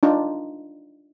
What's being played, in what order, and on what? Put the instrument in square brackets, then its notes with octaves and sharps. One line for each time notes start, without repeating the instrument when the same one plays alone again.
[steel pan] D4 D#4 F4